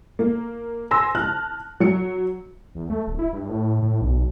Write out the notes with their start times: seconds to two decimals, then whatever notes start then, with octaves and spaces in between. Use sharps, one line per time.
0.19 A#3
0.91 G#5 C6 E6 A#6
1.15 A5 F6 F#6
1.80 F#3 C#7
2.75 E2
2.90 A3
3.07 D1
3.19 E4
3.33 G2
3.49 A2
3.82 A2
4.01 B1